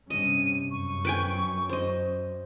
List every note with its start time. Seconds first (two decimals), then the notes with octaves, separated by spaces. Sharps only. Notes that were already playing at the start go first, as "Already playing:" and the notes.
0.10 G2 C3 C#4 D#5 D#7
0.71 F#2 C#6
1.05 B4 G5 G#5
1.69 C5 D#5